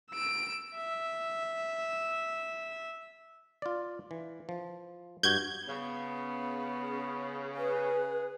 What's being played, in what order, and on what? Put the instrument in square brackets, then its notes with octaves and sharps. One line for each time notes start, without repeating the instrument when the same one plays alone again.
[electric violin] E6 D7
E5
[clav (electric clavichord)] F4 D5
E3
F3
[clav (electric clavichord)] G2 F#4 [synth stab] G6 G#6
[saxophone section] C#3 [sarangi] B3
[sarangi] G#4 [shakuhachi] B4